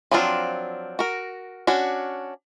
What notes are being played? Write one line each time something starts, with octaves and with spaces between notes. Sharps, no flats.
F3 F#3 C4 D4 F4
F#4 A#4
C#4 D4 F#4